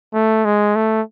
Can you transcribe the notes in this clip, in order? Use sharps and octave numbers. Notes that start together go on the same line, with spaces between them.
A3
G#3
A3